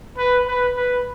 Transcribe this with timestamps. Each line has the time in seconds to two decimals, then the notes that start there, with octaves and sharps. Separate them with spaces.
0.18 B4
0.47 B4
0.76 B4